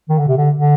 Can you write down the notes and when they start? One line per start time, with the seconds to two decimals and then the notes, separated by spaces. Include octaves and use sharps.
0.09 D#3
0.18 D3
0.28 C3
0.37 D3
0.56 D3